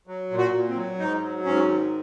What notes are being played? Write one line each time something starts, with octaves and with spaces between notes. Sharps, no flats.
F#3
A#2
F#4
A#2
C4
F#3
G#2 D#4
F#3
G#2 C#4
D#3